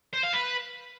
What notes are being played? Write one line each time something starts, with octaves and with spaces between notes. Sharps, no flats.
C5
F5
B4